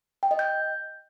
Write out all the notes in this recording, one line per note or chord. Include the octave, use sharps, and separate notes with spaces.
G5
D#5
G6